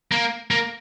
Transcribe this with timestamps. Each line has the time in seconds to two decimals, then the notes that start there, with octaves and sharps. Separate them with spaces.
0.12 A#3
0.51 A#3